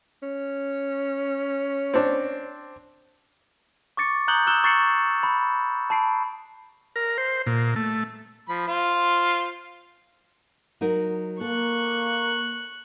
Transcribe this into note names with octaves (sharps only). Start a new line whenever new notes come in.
C#4
C4 D4
C#6 D6 A6 C#7
A#5 D#6 F#6 G6 F#7 G7
D#6 E6 F#6 E7 G7
C#6 A6 C7 C#7 F#7
B5
A5 B5 C7 D7
A#4
C5
A#2
A3
F3 B5
F4 C5 C6
F#3 D#4 A#4
A#3 A4 C#6 F#6